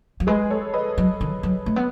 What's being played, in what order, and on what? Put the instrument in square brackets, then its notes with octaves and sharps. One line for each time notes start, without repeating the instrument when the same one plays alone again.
[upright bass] F#3
[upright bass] G#3 [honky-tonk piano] G#4 B4
[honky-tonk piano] A4 C#5
B4 D#5
[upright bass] F#3
D#3
F#3
A3
B3